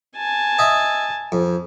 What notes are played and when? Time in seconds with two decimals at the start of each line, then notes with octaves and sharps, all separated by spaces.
0.16 G#5 A5
0.59 D#5 E5
1.32 F2